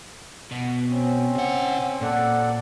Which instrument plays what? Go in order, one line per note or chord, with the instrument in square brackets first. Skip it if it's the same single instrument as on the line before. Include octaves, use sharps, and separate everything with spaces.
[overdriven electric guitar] B2
[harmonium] C4 C#4
[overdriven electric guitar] C#3 F#5
[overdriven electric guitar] A#2 [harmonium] A4 D5 F#5